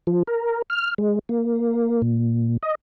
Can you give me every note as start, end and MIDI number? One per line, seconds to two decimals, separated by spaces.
0.07 0.23 53
0.27 0.62 70
0.70 0.94 89
0.98 1.19 56
1.29 2.02 58
2.02 2.57 46
2.63 2.75 75